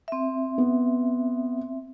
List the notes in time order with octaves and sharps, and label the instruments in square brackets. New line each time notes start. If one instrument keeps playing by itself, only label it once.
[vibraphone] C4 E5
[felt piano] B3